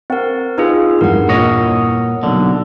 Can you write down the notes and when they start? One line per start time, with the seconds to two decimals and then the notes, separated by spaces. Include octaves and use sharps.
0.10 C4 A#4 F#5
0.58 D#4 F4 G#4 B4 F5 E6
1.01 E2 G2 A#4 F#5
1.29 A#2 C#5 D#5
2.23 B1 D3 D5